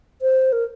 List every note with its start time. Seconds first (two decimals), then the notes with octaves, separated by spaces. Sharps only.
0.22 C5
0.52 A#4